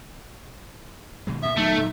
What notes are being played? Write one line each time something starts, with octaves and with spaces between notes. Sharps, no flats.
B2 D#3 G#3
G2 A#2 E5 D#6
D#1 F#3 A3 B3 D#4
A#2 F3 F#3